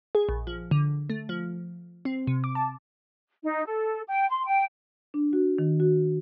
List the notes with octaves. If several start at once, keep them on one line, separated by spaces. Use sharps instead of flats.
G#4
A#1
F3
D3
A3
F3
C4
C3
D6
A5
D#4
A4
G5
C6
G5
D4
F#4
D#3
F#4